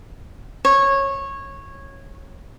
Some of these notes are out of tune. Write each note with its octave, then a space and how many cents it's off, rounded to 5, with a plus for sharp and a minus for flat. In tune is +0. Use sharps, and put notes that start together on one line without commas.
C#5 -15